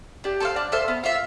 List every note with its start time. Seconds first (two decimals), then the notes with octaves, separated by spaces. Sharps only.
0.24 D4 G4
0.40 A4 C5 F5
0.56 D4 D5
0.72 A4 C5 E5 F5
0.88 B3
1.03 F4 C5 E5 F5